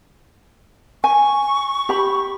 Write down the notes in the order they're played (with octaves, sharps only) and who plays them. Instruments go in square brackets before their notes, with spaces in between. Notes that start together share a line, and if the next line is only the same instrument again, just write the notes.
[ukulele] G#5 [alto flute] C#6
[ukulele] G4 B5